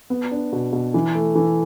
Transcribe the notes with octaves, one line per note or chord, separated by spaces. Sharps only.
B3
D4
B2
B2
E3
A3
E3